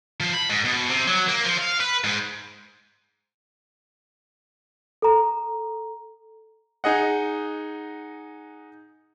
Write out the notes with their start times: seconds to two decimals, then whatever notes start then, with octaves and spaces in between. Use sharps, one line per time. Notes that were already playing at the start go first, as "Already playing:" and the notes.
0.20 F3
0.34 B5
0.50 G#2
0.65 B2
0.89 C3
1.07 F#3
1.28 A#3
1.45 F3
1.59 F5
1.80 B4
2.04 G#2
5.02 A4 A#5
6.84 D#4 G#4 D#5 F#5